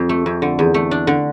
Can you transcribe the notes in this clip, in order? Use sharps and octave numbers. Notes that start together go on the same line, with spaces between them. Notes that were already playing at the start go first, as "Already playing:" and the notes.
Already playing: F2
A3
F2
D3
E2
A3
D4
D3